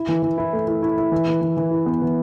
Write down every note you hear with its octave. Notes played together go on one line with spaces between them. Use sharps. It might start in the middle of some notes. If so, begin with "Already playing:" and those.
Already playing: E4
E3
E3
E4
A3
E4
E4
E4
E3
E3
E3
E3
E4
B3
E3